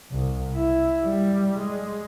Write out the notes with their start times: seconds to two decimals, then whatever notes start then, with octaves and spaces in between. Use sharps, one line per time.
0.11 C2
0.55 E4
1.05 G3
1.58 G#3